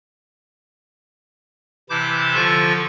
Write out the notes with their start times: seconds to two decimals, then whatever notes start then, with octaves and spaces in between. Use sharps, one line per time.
1.90 C3 E3 E4 A5 D6 G6
2.35 D3 F3 F4 A4 C#6